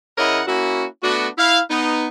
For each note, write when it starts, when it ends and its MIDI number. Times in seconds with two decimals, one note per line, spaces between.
0.18 0.42 49
0.18 0.42 64
0.18 0.42 70
0.18 0.42 73
0.18 0.42 75
0.18 0.42 78
0.48 0.85 58
0.48 0.85 61
0.48 0.85 64
0.48 0.85 66
1.03 1.28 57
1.03 1.28 59
1.03 1.28 62
1.03 1.28 66
1.38 1.60 64
1.38 1.60 77
1.70 2.08 59
1.70 2.08 63